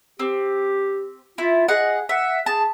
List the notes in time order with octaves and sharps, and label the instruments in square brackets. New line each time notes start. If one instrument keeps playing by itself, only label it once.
[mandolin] C4 [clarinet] G4
[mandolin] E4 [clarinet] F4
[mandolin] G#4 F#5 [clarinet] D#5
[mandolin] E5 [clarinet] F#5
[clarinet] G#4 [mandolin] A5